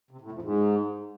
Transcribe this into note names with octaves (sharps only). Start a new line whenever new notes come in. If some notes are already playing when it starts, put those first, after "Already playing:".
C3
A2
F2
G#2